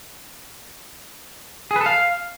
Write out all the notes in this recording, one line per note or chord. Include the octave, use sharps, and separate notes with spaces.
G#4
B4
A4
F5